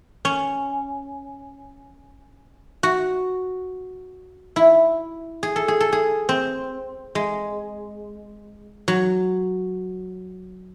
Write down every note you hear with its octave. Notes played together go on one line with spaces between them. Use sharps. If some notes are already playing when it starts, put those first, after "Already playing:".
C#4
F#4
E4
G#4
A4
G#4
A4
G#4
C4
G#3
F#3